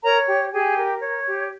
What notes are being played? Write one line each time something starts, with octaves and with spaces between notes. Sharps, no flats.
A#4 C#5 A#5
G4
G4 G#4 G#5
A#4
C#5
G4